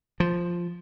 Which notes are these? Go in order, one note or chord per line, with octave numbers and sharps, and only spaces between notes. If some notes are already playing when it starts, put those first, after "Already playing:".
F3